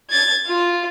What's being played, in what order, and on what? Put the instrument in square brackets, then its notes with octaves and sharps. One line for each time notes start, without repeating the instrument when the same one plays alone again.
[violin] G#6 A6
F4